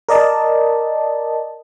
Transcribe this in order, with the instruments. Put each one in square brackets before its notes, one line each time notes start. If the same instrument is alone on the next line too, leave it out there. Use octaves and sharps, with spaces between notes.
[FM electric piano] A#4 D5 D#5 A5